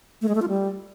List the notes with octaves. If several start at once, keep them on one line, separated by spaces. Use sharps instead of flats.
A3
G#3
A3
F4
G3